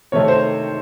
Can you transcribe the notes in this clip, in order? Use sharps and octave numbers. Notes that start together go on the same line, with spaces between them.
C3 D#3 A3 C#5
C5